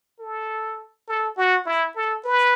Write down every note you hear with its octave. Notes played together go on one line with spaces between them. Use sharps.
A4
A4
F#4
E4
A4
B4